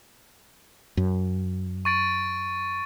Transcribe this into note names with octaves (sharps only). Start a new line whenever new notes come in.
F#2
C#6 A6 D7